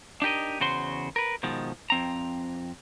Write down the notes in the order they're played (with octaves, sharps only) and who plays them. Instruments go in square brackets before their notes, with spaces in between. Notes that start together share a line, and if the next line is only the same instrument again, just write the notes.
[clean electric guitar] D4 D#4 G4 A#4 D#5
E2 C#3 F#4 C5 C6
A#4 B4
B2 D#3 F3 G#3
F2 C4 A#5